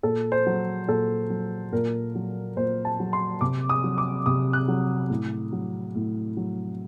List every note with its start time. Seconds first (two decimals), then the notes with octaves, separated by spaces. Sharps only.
0.03 A#2 A4
0.32 C5
0.46 F#3
0.87 A#2 A4
1.30 F#3
1.72 A#2 A#4
2.15 F#3
2.56 A#2 C5
2.85 A5
3.00 F#3
3.13 C6
3.41 C3 D6
3.69 D#6
3.84 F#3
3.98 D6
4.26 C3 D#6
4.53 F#6
4.68 F#3
5.10 A2
5.52 F#3
5.95 A2
6.37 F#3